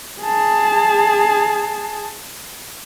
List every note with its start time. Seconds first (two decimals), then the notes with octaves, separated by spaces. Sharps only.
0.22 G#4 A5